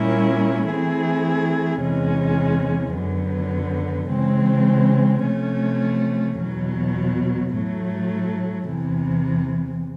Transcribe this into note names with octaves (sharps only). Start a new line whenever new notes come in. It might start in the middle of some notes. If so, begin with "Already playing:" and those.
Already playing: A#2 G3 A#3 C#4 E4
E3 A3 C4 E4 G#4
E2 C3 E3 G#3 C#4
F#2 D3 F#3 B3
C#3 E3 G#3 C4
C3 F3 A3 C#4
E2 B2 F#3
A2 F#3 A3
E2 C3 E3